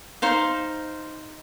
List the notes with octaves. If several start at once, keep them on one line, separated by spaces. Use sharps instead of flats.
D#4 C5 F5